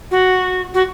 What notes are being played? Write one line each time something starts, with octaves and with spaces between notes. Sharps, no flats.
F#4
F#4